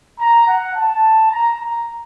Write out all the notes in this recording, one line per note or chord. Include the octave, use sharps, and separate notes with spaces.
A#5
F#5
A5
A#5
A#5